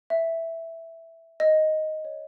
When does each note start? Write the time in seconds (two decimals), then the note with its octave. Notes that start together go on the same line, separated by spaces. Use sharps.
0.10 E5
1.40 D#5
2.05 C#5